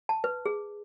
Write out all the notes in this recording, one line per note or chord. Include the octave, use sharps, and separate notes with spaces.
A5
B4
G#4